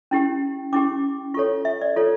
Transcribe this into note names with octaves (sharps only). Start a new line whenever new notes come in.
C#4 E4 G4
C#4 E4 G4 D6
F4 A4 C#5 C#6
E5
D5
F4 A4 C#5